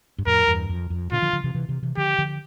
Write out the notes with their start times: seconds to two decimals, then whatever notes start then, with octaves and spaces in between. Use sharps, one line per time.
0.18 G2
0.26 F2 A2 A#4
0.47 E2 G2
0.69 F2
0.90 F2
1.12 A#2 D3 F4
1.22 D3 F3
1.33 D3 F3
1.44 C3 E3
1.55 C3 E3
1.69 C3 E3
1.83 C3 E3
1.97 D3 F3 G4
2.18 D3 F3